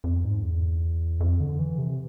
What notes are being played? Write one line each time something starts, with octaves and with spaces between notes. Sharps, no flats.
F2
G#2
E2
F2
D3
E3
C3